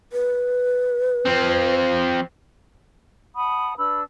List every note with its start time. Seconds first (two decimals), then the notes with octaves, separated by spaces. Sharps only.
0.13 B4
1.26 F3 C4
3.35 F#5 A5 B5 D#6
3.77 D4 B4 B5 E6